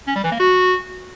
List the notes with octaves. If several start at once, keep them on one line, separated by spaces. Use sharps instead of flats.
C#4
G3
E3
A#3
F#4